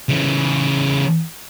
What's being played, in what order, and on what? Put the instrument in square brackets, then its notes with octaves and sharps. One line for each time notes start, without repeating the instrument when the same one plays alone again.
[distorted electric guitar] C#3 E3